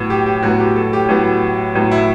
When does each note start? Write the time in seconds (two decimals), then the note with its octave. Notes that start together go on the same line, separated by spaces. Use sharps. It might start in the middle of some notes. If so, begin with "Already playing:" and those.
Already playing: A2 F#3 B3
0.10 G4
0.26 G4
0.43 A2 F#3 B3 F#4
0.60 G4
0.76 A4
0.93 G4
1.09 A2 F#3 B3
1.75 A2 F#3 B3
1.91 E4